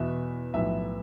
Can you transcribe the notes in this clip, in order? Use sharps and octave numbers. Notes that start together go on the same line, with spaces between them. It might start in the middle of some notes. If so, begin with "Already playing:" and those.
Already playing: E2 B2 B3 E5
B1 A2 F3 B3 E5